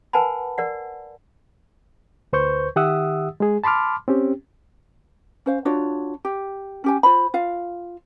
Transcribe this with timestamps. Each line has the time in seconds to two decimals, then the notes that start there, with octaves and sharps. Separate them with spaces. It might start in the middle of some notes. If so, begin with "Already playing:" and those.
0.13 A#4 B4 F#5 G#5 A5 B5
0.58 A#4 D5 F#5
2.33 D2 B4 C5 C#6 G6
2.76 D#3 G4 E5 F#5 D#6 E6
3.40 G#3 G#4
3.64 A5 B5 C6 D6 F6
4.08 C4 C#4 G4
5.46 C#4 C5 F5
5.65 D4 F4 F#4 C#5
6.25 G4
6.84 C#4 G4 G#5
7.03 F4 C5 B5
7.34 F4 F5